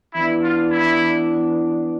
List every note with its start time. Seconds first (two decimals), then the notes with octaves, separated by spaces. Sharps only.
0.14 E3 B3 D4 E4
0.43 F4
0.71 E4